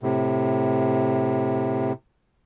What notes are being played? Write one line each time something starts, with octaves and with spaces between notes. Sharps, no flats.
A2 C3